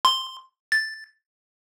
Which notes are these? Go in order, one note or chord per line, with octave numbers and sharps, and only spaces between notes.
C6
A6